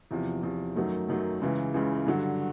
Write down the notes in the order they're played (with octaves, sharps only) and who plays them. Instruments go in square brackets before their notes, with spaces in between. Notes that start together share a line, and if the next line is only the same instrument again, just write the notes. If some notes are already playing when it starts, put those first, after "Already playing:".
[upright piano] E2 C3 F3
E2 C3 F3
F#2 D#3 F#3 A3
F#2 D#3 F#3 A3
C#2 C#3 E3
C#2 C#3 E3
G2 D3 F#3